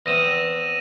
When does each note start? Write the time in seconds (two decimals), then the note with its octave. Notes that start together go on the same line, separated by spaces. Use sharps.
0.06 E2 C4 A#6 D#7 E7